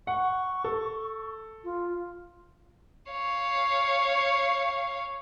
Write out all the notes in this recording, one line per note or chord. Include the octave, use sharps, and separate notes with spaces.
F#5 C#6
A4
F4
C#5 F5